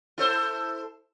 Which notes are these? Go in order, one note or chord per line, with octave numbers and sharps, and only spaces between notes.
E4 A4 C5